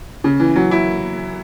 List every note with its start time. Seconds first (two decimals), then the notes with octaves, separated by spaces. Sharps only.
0.24 C#3
0.40 E3
0.56 F#3
0.71 E4